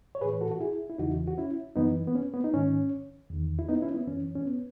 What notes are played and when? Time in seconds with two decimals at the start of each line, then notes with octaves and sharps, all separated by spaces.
0.15 C#5
0.21 A2 G#4 B4
0.25 E3
0.41 F#4 A4
0.51 F#4
0.61 E4 G#4
0.90 E4
0.98 E2 C#3 E3 D#4 F#4
1.28 F#4
1.38 C#4 E4
1.76 F#2 E3 B3 D#4
2.07 B3
2.15 C#4
2.34 B3
2.44 D#4
2.54 G#2 D#3 C#4
3.30 E2 D#3
3.59 E4
3.68 B3 D#4
3.82 C#4 E4
3.95 B3
4.07 F#2 E3 C#4
4.35 C#4
4.46 B3